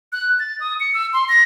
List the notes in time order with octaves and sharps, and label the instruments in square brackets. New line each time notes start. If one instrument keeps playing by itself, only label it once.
[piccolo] F#6
A6
D#6
C#7
E6
C6
A#6